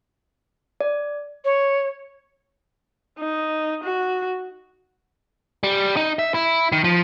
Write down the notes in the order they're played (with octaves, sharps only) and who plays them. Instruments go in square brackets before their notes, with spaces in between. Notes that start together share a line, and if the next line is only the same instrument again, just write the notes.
[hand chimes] D5
[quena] C#5
[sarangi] D#4
F#4
[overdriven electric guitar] G3
D#4
E5
E4
D#3
F3